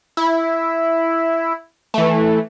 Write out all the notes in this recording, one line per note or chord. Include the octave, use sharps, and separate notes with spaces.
E4
E3 A3